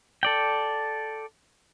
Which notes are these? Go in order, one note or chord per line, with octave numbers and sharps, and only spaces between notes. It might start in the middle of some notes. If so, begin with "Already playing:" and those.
A4 D5 G5